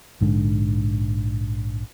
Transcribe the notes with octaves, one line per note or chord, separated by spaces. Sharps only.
A#1 G#2 D3